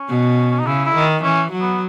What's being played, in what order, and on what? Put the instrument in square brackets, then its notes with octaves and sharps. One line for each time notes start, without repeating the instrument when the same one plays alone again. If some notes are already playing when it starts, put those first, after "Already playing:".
Already playing: [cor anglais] C#4
[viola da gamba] B2
[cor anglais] C#4
D#4
[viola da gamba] C#3 [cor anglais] E4
[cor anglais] E4
[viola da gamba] D#3
[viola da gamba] E3 [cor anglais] C#4
[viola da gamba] F#3
[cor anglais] B3